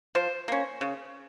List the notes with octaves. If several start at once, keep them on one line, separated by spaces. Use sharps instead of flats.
F3 C5
A#3 C#4
C#3